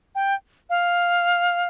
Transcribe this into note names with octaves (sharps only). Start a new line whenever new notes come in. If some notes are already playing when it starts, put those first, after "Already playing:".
G5
F5